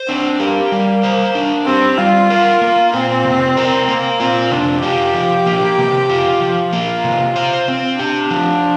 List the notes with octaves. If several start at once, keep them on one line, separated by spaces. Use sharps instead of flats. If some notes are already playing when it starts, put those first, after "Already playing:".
Already playing: C5
C4 D4
A#3 G4
G3
C5
D4
C4 G4
G3 F4
A#4
A#3
C4 F4
C3
A#4
A#3
C4 F4
C3 D4
F4 G4
F3
A#3
C3
F4
F3
A#3 F4
C3
C5
C4
D4 G4
F3